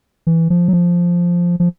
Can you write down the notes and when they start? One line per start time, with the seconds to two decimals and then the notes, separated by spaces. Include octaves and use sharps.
0.27 E3
0.50 F3
0.68 F#3
0.73 F3
1.60 F3